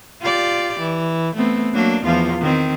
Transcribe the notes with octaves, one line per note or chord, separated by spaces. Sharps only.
F4 G4 D5
E3
A3 B3 C4
F#3 A#3 D4
E2 F3 F4
D#3 C4